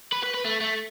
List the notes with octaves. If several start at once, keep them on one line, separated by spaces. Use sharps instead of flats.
B4
B4
B4
A3
A3